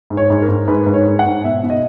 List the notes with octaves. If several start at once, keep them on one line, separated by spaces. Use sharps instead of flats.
G#2
C#5
G#2
A#4
G#2
G#2 B4
G#2
C#5
G#2
F#5
G#2
B2 E5
B2
D#5